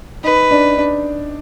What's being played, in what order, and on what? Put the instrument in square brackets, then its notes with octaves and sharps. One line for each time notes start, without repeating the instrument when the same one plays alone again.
[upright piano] D#4 [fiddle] B4
[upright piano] D4
D4